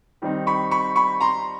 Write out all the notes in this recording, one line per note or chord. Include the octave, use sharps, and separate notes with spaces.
D#3 G3 C4 D#4
B5 C#6
B5 C#6
B5 C#6
A#5 C6